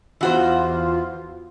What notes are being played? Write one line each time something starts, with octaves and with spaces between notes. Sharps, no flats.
E2 E3 F4 F#4 C5